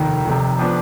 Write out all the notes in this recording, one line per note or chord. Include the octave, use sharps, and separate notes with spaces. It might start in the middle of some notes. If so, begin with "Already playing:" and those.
Already playing: F1 D#2 D#3
F1 F2 C3
F3 B3 D4